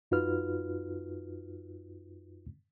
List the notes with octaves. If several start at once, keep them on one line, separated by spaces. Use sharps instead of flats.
F#2 D#4 F4 F#4 B4 F6